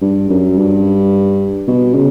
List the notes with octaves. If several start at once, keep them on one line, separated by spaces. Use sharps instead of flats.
G2
F#2
G2
B2
C#3